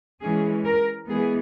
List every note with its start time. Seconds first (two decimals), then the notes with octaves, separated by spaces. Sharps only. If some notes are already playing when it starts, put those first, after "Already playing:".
0.23 E3 G#3 C#4 G#4
0.66 A#4
1.09 E3 G#3 B3 G#4